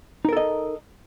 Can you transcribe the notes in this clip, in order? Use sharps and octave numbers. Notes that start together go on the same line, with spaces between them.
D#4 A4 A#4 D#5